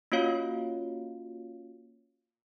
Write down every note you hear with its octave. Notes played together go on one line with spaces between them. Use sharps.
A#3 C#4 F4 F#4 C#5 F5